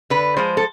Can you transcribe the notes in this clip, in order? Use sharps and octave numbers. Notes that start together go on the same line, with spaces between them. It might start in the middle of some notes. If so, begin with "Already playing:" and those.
D3 B4
F3 G#3 C5
A4